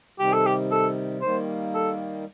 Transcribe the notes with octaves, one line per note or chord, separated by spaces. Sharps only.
C3 D#3 G3 G4
A4
G4
A4
D#3 G3 A#3 C5
A4